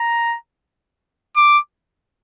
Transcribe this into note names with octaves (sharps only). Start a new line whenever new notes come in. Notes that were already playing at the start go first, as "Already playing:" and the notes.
Already playing: A#5
D6